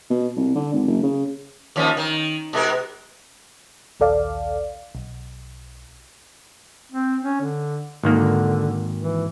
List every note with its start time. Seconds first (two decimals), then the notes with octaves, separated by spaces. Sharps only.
0.10 B2
0.36 C2
0.55 D3
0.73 G#1
0.88 F#1
1.03 C#3
1.76 D#2 F3 C#4
1.97 D#3
2.53 B2 G#3 A#4
4.00 A#1 D#2 A4 D5 F5
4.95 B1
6.92 C4
7.23 C#4
7.41 D3
8.03 G#1 D3 D#3 A#3
8.97 E3